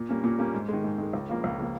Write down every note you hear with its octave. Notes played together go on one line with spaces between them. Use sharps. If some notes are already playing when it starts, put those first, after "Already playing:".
Already playing: A#2
G3 A#3 C#4
A#2
G3 A#3 C#4
G#2
D#3 G#3
G#2
D#3 G#3
C#2
C#3 F3 A#3
C#2
C#3 F3 A#3